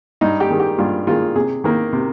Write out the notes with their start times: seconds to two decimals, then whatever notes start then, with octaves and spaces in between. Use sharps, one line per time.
0.21 G2 D#4
0.40 G4
0.50 D#3 G#3
0.60 G4
0.78 G2 F4
1.07 D#3 G#3 F4
1.35 C3 G#4
1.64 D#3 A#3
1.93 C3